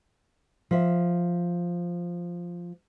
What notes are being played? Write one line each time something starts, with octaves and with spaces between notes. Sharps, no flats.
F3 E5